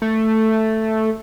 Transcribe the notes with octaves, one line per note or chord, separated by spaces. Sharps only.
A3